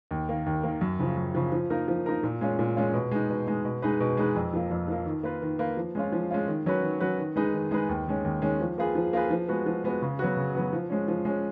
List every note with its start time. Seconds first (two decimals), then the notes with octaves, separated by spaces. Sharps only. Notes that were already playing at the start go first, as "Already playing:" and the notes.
0.11 D#2
0.29 D#3 A#3
0.46 D#2
0.64 D#3 A#3
0.81 F#2
0.99 C#3 F3
1.17 F#2
1.35 C#3 F3
1.52 F3
1.70 A#3 D#4 A#4
1.88 F3
2.06 A#3 D#4 A#4
2.23 A#2
2.41 G#3 C#4 F4
2.59 A#2
2.76 G#3 C#4 F4
2.93 B2
3.11 G#3 D#4
3.29 B2
3.47 G#3 D#4
3.64 B2
3.82 G#3 D#4 G#4 B4
4.00 B2
4.17 G#3 D#4 G#4 B4
4.36 F2
4.54 F3 A#3
4.71 F2
4.88 F3 A#3
5.06 D#3
5.23 A#3 F4 B4
5.42 D#3
5.59 A#3 F4 B4
5.77 F3
5.95 G#3 C#4 F4
6.13 F3
6.31 G#3 C#4 F4
6.48 D#3
6.66 F#3 C#4 F#4 B4
6.83 D#3
7.00 F#3 C#4 F#4 B4
7.18 D#3
7.36 G#3 D#4 G#4 B4
7.54 D#3
7.71 G#3 D#4 G#4 B4
7.89 D#2
8.07 D#3 G#3 C#4
8.24 D#2
8.42 D#3 G#3 C#4
8.61 F3
8.78 A#3 F4 G#4 B4
8.95 F3
9.13 A#3 F4 G#4 B4
9.30 F3
9.48 G#3 B3 F#4
9.66 F3
9.84 G#3 B3 F#4
10.02 C#3
10.19 F#3 B3 F#4
10.37 C#3
10.55 F#3 B3 F#4
10.73 F3
10.90 G#3 C#4
11.08 F3
11.25 G#3 C#4